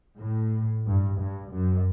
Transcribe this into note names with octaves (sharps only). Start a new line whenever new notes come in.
A2
G2
G2
F#2